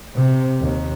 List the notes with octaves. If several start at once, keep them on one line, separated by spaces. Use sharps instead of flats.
C3
D#2